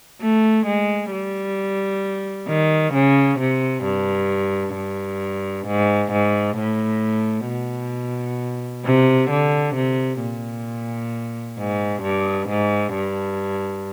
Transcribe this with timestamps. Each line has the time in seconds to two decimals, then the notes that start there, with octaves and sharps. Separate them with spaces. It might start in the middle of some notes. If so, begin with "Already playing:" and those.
0.21 A3
0.66 G#3
1.12 G3
2.48 D#3
2.94 C#3
3.40 C3
3.84 G2
4.76 G2
5.67 G#2
6.12 G#2
6.57 A2
7.49 B2
8.85 C3
9.30 D3
9.76 C3
10.21 A#2
11.58 G#2
12.03 G2
12.49 G#2
12.94 G2